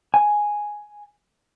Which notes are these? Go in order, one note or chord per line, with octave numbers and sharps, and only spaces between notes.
G#5